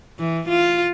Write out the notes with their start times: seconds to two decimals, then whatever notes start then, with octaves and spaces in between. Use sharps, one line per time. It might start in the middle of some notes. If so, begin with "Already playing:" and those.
0.19 E3
0.48 F4